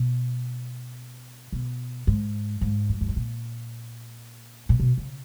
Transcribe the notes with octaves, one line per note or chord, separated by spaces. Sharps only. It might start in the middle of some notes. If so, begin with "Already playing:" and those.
Already playing: B2
B2
G#2
G#2
F#2
F#2
G#2
A#2
A#2
B2
C#3